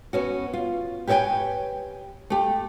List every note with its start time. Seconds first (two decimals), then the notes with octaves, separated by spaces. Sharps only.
0.13 B3 C#4 F#4
0.53 F4
1.07 G4 B4 C#5 D#5 G5 G#5
2.30 A3 G4